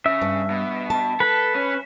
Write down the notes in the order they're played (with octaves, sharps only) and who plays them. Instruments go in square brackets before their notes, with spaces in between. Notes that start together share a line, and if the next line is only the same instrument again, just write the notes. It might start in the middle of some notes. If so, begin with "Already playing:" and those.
[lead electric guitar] C#3 [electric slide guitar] E5
[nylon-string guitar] G2
[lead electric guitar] B2
[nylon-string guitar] A5
[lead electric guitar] A4 [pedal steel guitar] B4
[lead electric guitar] C#4